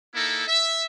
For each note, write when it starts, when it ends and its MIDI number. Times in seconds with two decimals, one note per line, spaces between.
0.15 0.45 58
0.15 0.45 63
0.15 0.45 64
0.15 0.45 69
0.46 0.83 76